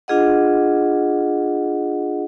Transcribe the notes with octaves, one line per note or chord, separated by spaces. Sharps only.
D4 F4 G#4 D#5 F#5